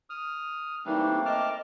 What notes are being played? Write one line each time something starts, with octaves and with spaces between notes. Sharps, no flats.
D#6 F6
E3 G3 A3 A#3 C4 D4 D#4
D#5 A5 D6 F6